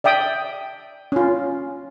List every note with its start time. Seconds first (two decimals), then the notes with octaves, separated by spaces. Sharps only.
0.04 D5 E5 G5 D#6
1.12 C#4 F4